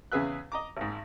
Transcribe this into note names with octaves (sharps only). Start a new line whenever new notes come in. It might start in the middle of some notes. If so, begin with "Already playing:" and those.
E2 C#3 G#4 B4 E5 F#6
D#5 A#5 D6
G#1 G#2